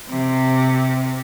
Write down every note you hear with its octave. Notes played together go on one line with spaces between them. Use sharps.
C3